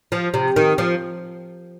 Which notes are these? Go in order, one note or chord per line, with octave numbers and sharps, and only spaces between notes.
F3
C3
D#3
F3